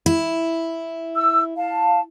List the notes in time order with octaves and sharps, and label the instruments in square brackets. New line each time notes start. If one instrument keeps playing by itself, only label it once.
[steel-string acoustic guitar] E4
[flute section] E6
F5 A5